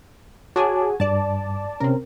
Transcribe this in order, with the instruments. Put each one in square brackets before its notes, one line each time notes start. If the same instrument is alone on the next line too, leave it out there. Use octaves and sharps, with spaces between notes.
[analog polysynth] F#4 G#4 G#5 [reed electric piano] C#5 A5 D6
[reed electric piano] G2 [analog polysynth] D5 A5
[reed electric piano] C3 C#4 [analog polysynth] C4 A#4